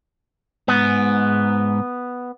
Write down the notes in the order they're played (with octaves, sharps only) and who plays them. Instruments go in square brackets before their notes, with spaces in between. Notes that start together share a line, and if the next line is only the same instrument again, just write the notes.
[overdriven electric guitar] G#2 [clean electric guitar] B3